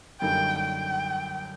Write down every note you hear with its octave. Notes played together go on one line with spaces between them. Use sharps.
F#2 D3 G3 A#3 D#4 G5
G5